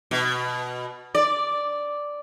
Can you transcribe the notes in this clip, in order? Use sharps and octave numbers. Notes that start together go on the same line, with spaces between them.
B2
D5